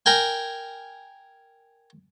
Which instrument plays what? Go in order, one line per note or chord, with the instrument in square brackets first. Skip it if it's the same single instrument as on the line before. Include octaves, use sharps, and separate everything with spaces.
[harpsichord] A#4 G5 G#5